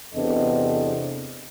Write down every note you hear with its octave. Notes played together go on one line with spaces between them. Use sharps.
E2 C3 B3 D4 A4 D#5